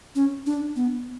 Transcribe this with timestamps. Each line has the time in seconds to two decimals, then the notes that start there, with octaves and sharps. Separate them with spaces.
0.15 C#4
0.46 D4
0.76 B3